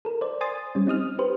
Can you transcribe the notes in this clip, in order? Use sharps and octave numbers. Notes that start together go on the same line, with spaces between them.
A4 A#4
C5 D5
G#5 C6 D#6 A6
G3 C#4
C4 D#4 D#6 F6
G4 B4 C5